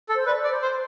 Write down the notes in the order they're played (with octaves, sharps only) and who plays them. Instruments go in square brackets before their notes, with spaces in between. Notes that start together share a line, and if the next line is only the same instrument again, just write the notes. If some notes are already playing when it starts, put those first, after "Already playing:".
[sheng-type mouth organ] A4
[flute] C5
[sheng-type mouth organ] B4 [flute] D5
[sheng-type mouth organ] D5
[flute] C5
[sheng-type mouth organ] C5